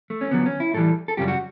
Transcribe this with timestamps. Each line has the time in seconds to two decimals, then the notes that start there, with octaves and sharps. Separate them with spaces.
0.10 A3
0.21 C#4
0.31 D2 D3 F#3 B3
0.46 C#4
0.60 E4
0.74 A2 E3 G3 A4
1.08 A4
1.17 F#2 C#3 G3 G4
1.28 F#4